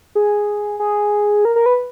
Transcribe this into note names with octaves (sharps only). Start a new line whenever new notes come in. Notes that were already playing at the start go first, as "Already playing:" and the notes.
G#4
G#4
A#4
A#4
B4